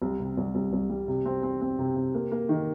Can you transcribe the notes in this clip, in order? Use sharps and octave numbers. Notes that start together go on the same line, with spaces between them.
C2
C3
C2
C2
C2
G3
C3
C4
C4
C4
C3
C3
A#3
A#3
D#3